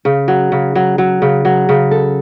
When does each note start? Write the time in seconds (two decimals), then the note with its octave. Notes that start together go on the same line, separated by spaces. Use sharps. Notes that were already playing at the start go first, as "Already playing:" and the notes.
0.05 C#3
0.28 F#3
0.52 C#3
0.75 F#3
0.98 F#3
1.22 C#3
1.45 F#3
1.69 C#3
1.91 A4